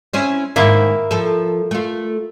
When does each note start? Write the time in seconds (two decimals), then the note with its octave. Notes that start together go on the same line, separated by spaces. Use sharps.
0.14 C4 C#4 E4
0.56 G#2 D#3 A#3 E4 C5 E5
1.11 F3 A4
1.71 A3 F4